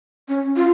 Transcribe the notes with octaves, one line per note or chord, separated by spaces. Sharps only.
C#4
F4